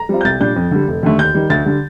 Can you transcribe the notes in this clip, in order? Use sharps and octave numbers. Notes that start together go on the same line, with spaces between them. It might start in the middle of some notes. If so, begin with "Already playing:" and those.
Already playing: A#5
G3 C4 F4
G6
C2 A6
A#2 G3 D4 G6
F2
D3 G3
F1
D#2 D3 A3
D#2 G6
D#3 G3
D2 A6
D3 G3